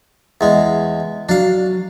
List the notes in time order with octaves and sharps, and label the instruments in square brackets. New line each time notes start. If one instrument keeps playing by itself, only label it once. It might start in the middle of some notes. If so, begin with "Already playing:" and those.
[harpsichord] E2 G#3
[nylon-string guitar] F#3 [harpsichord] D4 F5